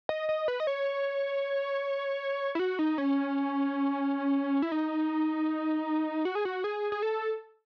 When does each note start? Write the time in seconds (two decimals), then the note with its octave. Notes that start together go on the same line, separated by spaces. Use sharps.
0.09 D#5
0.29 D#5
0.48 B4
0.60 D#5
0.67 C#5
2.55 E4
2.59 F#4
2.79 D#4
2.98 C#4
4.62 E4
4.72 D#4
6.25 F#4
6.35 G#4
6.45 F#4
6.64 G#4
6.92 G#4
7.02 A4